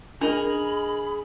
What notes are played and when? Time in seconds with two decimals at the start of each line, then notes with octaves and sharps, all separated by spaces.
0.21 D4 G#4 A#4 D#5 B5